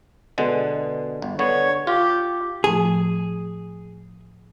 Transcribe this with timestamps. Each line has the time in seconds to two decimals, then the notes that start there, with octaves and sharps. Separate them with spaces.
0.38 B2 D3 G#3
1.22 G1
1.39 D3 B3 C#5
1.87 F4 G4
2.64 A2 F3 A3 G#4